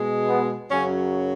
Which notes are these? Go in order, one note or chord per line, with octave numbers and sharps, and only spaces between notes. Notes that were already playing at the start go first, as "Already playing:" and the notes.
Already playing: B2 G#3
B3
F#2 C#3 F#3 C#4